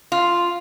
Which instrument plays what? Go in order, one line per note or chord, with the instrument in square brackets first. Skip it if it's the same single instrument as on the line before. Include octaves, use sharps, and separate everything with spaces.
[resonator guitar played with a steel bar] F4